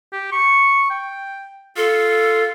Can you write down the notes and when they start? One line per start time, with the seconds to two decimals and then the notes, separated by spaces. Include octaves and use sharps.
0.13 G4
0.32 C#6
0.90 G5
1.77 F4 A4